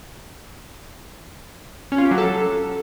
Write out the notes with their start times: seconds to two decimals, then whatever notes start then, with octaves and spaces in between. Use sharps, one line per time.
1.92 C#4
1.98 F4
2.05 G4
2.11 F#3
2.18 A4